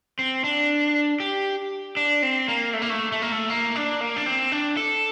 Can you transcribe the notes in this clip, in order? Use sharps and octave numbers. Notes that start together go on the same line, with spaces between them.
C4
D4
G4
D4
C4
A#3
A3
A#3
A3
A3
A#3
A3
A#3
D4
A#3
D4
C4
D4
A4